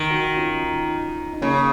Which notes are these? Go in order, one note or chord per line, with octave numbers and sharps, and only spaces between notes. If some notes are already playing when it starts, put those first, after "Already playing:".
Already playing: D#3
D#4 F#4
C#4 F4
D#4
C#3 A#3 C#4